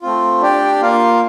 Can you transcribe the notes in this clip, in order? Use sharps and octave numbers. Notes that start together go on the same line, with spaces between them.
A3 C4 F4
D4 G4 D5 G5
A#3 F4 A#4 F5